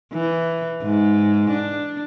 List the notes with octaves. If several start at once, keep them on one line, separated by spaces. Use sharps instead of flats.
E3
G#2
D4